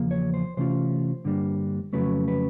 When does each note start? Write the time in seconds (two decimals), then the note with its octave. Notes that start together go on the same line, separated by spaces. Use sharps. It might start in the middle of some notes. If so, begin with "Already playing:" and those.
Already playing: E2 C#3 F3 A#3
0.11 C#5
0.34 C5
0.57 C3 E3 A3 C#4 F4 C5
1.25 G2 D3 G3 A#3 D4
1.93 F2 C#3 F#3 A3 C#4 B4
2.28 B4